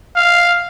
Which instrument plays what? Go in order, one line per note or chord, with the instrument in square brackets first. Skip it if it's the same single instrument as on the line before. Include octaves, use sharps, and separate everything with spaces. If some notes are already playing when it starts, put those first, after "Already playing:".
[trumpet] F5